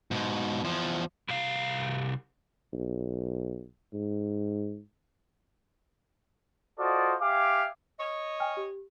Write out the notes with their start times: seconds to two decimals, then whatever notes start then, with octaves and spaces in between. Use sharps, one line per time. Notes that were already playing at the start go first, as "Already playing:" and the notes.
0.11 G#2 B2
0.64 E2 F3
1.28 C2 F5
2.73 B1
3.93 G#2
6.79 F4 F#4 A4 C5 D5 D#5
7.22 G4 E5 F5 G#5 D6
7.99 C#5 D#5
8.40 G5 G#5 F6
8.57 G4